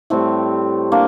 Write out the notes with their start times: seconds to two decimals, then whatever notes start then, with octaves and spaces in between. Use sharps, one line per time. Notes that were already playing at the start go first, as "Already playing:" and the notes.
0.10 A2 G3 A3 C4
0.92 A#3 D4